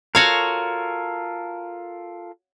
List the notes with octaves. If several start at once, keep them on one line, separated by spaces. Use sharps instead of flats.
F4 F#4 A4 A#4 C#5 F5